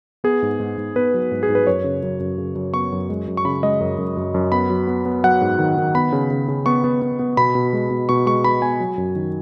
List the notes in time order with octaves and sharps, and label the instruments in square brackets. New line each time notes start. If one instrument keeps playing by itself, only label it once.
[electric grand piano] B3 G#4
G#2
G#2
G#2
B3 B4
F#3
G#2
G#4
G#2
B4
F#2 C#5
C#3
F#2
F#2
C#3
F#2
B3 C#6
F#2
G#3
F#2
C#6
C#3 B5
G#3 D#5
F#2
F#2
F#2
F#2
B3 B5
F#3
B3
B3
F#3 F#5
G#2
D#3
D#3
B3 B5
C#3
C#3
C#3
B3 C#6
B3
B3
B3
B2 B5
B2
G#3
B2
B2 C#6
G#3 C#6
B3 B5
B3 G#5
F#3
F#2
D#3